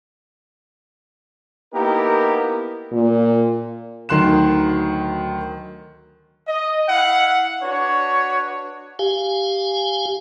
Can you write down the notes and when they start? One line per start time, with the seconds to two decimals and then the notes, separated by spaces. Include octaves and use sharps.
1.74 A#3 B3 D#4 E4 G4 A#4
2.92 A#2
4.09 D2 D#3 F#3 C6 F#6 E7
6.47 D#5
6.88 E4 F5 F#5
7.62 D4 F#4 B4 C#5
8.99 G4 F5 G#5